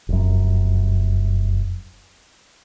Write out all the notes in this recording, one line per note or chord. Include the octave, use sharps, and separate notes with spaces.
F1 F#2